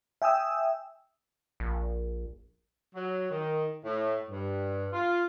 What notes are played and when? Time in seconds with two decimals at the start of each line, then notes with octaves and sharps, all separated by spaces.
0.22 E5 G5 G#5 D#6 E6
1.60 A#1
2.95 F#3
3.31 D#3
3.85 A2
4.29 G2
4.93 F4